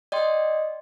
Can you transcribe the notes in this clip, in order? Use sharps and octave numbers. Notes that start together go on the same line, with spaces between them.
D5 D#5 G5 C6